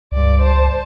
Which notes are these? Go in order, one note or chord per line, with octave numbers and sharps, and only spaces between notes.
C#2 G2 D5
C5 A5